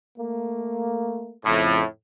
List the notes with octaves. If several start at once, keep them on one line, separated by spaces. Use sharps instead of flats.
A3 A#3
F2 A2 C#3